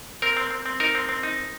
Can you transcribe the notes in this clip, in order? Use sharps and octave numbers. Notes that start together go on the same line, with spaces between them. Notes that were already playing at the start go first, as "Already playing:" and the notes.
C4 A#4
C4
C4
C4
D#4 A#4
C4
C4
D#4